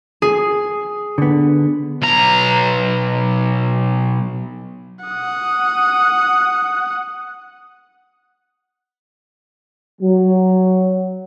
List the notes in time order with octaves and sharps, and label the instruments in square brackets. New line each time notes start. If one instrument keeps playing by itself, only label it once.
[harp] G#4
[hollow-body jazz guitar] D3 B3
[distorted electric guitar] B1 A#5
[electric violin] F#5 D#6
[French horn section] F#3